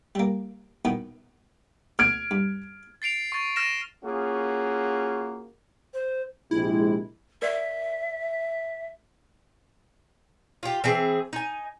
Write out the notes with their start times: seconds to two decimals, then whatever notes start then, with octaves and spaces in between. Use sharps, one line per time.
0.15 G3 A#3
0.85 B2 D#3 B3
1.99 D2 B2 F6 G#6 D7
2.31 G2
3.02 A6 C7 D7 F7
3.32 C#6 A6
3.56 F6 A#6 E7
4.04 A#3 C#4 F4 F#4 G#4
5.94 C5
6.51 A#1 C3 G#3 E4
7.42 A#4 D5 E5 F5
10.63 F4 G4
10.84 E3 C4 G#4
11.33 D#4 G#5